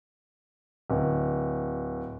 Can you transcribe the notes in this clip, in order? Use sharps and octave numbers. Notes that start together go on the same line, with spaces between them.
D1